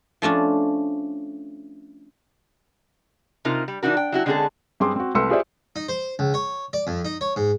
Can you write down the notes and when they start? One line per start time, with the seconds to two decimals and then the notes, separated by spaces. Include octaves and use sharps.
0.22 F3 A3 C#4 D4
3.45 C3 D#4 F4 A#4
3.68 G3
3.83 E3 D4 D#4 F#4 A#4
3.97 G5
4.12 F#3 E4 F#4
4.26 D3 G#3 C4 C#4 G#4 A4
4.80 G2 C4 G#4 C6 D6
4.96 C4 F#4
5.15 C2 A3 B4 C6 E6 C#7
5.30 F4 G4 G#4 C5 D5 E5
5.76 D#4
5.88 C5
6.19 C#2
6.34 C#5
6.73 D5
6.87 F2
7.05 D#4
7.21 C#5
7.36 G#2